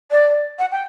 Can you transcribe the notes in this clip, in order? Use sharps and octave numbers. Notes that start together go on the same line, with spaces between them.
D5
F#5
G5